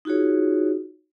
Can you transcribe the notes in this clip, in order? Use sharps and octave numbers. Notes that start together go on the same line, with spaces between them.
D#4 F4 F#4 G#4 C#5